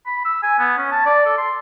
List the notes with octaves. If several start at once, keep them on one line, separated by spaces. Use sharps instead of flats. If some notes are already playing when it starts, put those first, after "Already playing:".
B5
E6
G#5
B3
C#4
A5
D5
A4
C6